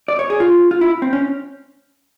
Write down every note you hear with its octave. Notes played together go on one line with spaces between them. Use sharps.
D5
C#5
G#4
F4
F4
E4
C4
C#4